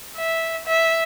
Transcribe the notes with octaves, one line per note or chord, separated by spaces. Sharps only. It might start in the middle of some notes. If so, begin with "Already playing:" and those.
E5
E5